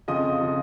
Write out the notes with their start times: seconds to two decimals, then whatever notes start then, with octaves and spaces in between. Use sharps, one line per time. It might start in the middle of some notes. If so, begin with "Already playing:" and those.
0.08 F2 C#3 F3 D#5 D#6
0.41 C#3 F3